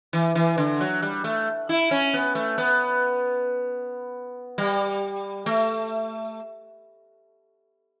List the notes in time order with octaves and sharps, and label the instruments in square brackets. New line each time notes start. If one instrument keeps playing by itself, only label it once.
[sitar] E3
E3
D3
F#3
G3
A3
E4
C#4
B3
A3
B3
G3
A3